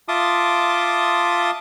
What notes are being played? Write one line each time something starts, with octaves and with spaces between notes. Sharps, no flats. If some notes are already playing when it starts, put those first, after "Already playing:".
F4 E5 A5 C6 D6 D#6